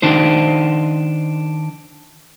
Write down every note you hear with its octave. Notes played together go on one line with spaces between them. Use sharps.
D#3 D4 D#4 C5